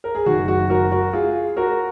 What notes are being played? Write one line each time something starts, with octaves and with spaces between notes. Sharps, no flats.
A#4
G#4
F#1 F#2 D#3 F#4
F#4
F#4 A#4
F#4 A#4
F4 G#4
F#4 A#4